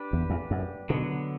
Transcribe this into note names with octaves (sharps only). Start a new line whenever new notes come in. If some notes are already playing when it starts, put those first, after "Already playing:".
Already playing: D4 G4 B4
E2
E2
F#2
B2 D3 F#3 B3